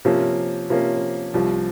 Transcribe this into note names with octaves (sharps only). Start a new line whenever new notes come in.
C3 F3 A#3 C#4
C3 F3 A#3 C#4
C2 C3 F3